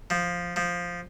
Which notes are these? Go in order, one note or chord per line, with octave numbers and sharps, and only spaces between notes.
F3
F3